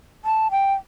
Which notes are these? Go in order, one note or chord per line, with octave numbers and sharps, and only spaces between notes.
A5
G5